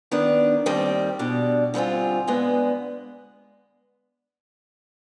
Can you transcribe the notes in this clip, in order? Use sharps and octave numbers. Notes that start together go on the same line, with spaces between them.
D#3 B3 D4
D#2 D#3 G3 C4 G4
B2 G3 D4
D3 G3 C4 F4 G#4
G2 D3 G#3 B3